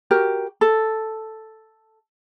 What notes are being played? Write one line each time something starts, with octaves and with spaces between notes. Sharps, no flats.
F#4 G4 A#4
A4